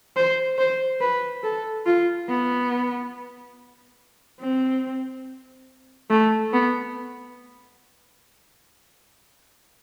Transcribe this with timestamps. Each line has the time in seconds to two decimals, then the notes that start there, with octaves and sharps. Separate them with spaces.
0.16 C5
0.58 C5
1.01 B4
1.43 A4
1.86 F4
2.28 B3
4.40 C4
6.10 A3
6.53 B3